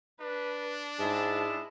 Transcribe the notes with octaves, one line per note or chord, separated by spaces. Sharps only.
D4 B4
G#2 G#3 E4 A5